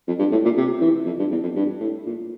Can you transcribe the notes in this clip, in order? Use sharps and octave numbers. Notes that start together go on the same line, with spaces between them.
F2
G2
A2
A#2
C3
E3
F2
G2
E2
F2
G2
A2
A#2